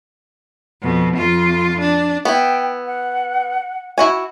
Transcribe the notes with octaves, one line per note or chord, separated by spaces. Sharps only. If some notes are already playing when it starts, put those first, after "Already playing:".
F2 B2
F2 F4
D4
B3 E4 G5
F#5
E4 F#4 G#5